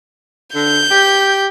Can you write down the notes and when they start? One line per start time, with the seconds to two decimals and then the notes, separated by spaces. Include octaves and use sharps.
0.55 D3 G6
0.91 G4